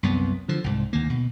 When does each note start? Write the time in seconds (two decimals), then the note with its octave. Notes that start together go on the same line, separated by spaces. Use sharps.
0.03 C2 F#2 B3
0.48 D3 F3
0.64 C2 G#2
0.93 D2 D#3 A#3
1.10 B2